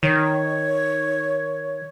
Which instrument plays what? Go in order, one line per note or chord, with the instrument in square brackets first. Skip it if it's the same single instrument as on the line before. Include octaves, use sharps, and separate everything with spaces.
[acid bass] D#3 [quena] C#5